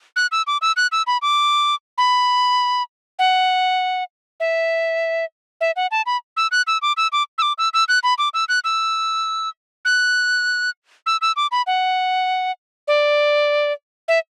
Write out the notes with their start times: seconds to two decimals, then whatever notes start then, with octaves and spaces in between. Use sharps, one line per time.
0.16 F#6
0.32 E6
0.47 D6
0.62 E6
0.77 F#6
0.92 E6
1.07 B5
1.22 D6
1.98 B5
3.19 F#5
4.40 E5
5.61 E5
5.76 F#5
5.91 A5
6.06 B5
6.37 E6
6.51 F#6
6.67 E6
6.82 D6
6.97 E6
7.12 D6
7.38 E6
7.42 D6
7.58 E6
7.74 E6
7.88 F#6
8.03 B5
8.18 D6
8.34 E6
8.49 F#6
8.64 E6
9.85 F#6
11.06 E6
11.21 E6
11.36 D6
11.51 B5
11.67 F#5
12.88 D5
14.08 E5